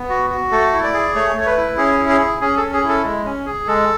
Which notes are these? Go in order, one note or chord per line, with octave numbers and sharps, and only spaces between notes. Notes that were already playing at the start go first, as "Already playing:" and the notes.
Already playing: B3
F#4
F#4
A3 A4
E4
D5
G#4
A3 C#5
A3 C#5
B4
E4
C#4 G#4
E4
G#4
G#4
C#4 G#4
A4
C#4
G#4
E4
A4
G#3
C#4
G#4
G#3 A4